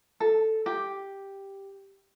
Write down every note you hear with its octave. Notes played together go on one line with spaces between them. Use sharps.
A4
G4